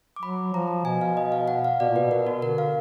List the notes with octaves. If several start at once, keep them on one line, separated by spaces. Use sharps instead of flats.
D6
F#3 B5
F3 A#5
B2 G#5
F5
D#5
F5
F#5
F5
B2 D5
A#2
B2 B4
B2 A#4
F#4
D3 A#4
F5